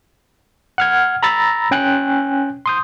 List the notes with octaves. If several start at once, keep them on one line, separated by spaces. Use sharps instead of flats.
F#5 F6 G#6
A#5 B5 E6 A6 A#6
C#4 G5 G#5 F#6
C6 D#6 G6